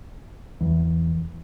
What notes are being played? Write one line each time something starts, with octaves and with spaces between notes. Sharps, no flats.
E2